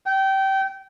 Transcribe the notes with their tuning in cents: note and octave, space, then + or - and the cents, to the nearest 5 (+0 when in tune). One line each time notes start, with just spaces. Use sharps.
G5 -25